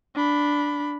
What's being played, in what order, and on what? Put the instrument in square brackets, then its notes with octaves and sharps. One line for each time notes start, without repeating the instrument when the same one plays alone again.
[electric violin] D4 B5